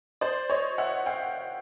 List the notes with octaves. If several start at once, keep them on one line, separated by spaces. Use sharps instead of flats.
C5 D5
C#5 D#5
E5 F#5
F5 G5